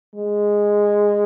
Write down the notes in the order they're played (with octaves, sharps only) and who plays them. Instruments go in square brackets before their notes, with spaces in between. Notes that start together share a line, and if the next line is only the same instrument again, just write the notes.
[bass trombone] G#3